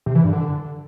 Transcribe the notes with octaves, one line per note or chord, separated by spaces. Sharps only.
C3
E3
G2
D3